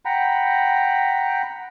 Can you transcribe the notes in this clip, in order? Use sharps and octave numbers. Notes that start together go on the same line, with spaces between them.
F#5 G5 A#5 B5